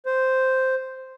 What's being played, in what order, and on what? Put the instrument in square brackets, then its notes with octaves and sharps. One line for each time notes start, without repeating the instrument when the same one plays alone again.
[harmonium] C5